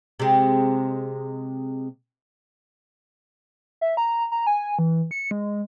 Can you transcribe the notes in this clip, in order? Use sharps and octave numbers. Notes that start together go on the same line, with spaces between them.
C3 G#3
E5
A#5
A#5
G#5
E3
C#7
G#3